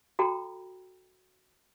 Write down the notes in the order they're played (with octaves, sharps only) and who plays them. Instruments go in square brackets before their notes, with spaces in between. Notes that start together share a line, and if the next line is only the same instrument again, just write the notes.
[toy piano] F#4 A4 G5 A#5 B5